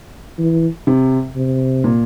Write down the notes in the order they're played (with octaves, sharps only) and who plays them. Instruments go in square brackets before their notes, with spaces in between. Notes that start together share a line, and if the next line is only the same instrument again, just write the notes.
[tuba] E3
[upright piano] C3
[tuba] C3
[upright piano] A#2